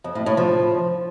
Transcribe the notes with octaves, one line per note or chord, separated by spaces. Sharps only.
F2
A2
A2
F3